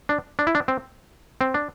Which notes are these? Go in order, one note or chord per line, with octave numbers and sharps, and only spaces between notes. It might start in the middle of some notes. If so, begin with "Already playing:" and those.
D4
D4
E4
D4
C4
C4
D4